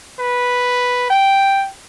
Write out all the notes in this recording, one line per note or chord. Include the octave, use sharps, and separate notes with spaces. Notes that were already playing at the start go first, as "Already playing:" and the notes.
B4
G5